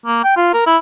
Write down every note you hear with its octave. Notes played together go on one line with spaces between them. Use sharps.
A#3
G5
F4
A#4
E4